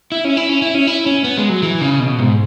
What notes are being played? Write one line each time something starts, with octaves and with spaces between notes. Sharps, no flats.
E4
C#4
E4
C#4
E4
C#4
E4
C#4
B3
G#3
F#3
E3
C#3
B2
G#2